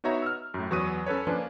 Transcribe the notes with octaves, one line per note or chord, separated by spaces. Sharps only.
B3 D#4 F#4 C#5 E5 A#5
E6 F6
F#2 A2
E2 F#3 B4 C#6 D#6 D#7
C#4 A4 B4 C#5
F3 A#3 C#4 D4 F4 B4